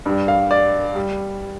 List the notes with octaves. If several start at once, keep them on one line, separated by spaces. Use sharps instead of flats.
G2 G3
F5
D5
G3